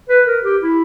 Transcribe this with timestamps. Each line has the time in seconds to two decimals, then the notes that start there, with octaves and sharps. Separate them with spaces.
0.09 B4
0.27 A#4
0.44 G4
0.62 E4